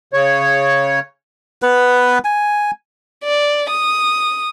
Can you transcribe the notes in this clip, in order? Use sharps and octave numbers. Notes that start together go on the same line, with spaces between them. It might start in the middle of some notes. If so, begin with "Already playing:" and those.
C#3 C#5
B3 B4
G#5
D5
D#6